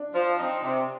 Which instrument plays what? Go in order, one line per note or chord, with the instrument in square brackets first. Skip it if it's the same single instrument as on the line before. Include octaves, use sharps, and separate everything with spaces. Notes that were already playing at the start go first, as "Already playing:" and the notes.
Already playing: [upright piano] D4
[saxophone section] F3
C4 D#4
C3